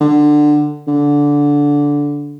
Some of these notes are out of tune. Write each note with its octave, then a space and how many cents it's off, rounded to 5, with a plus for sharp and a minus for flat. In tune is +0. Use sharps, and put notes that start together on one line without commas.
D3 +15
D3 -15